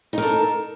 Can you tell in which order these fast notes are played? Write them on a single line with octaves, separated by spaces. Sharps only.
D#4 A#4 A4